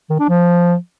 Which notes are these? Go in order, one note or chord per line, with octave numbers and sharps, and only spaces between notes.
D#3
D4
F3